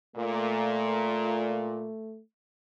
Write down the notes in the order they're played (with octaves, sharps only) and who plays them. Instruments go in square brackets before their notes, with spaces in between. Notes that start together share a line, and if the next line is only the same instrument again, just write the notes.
[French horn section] A#2 [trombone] A3